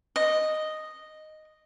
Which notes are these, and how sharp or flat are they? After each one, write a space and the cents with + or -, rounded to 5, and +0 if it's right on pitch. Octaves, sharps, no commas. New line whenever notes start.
D#5 -5